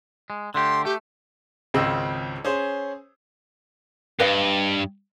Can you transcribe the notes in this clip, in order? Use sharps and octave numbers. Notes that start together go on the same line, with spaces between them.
G#3
D3 A3 G4 C6
A3 G4
G#1 C#2 C#3 C4 D#5 E6
C#4 G#4 C5
G2 B4 D#5 F5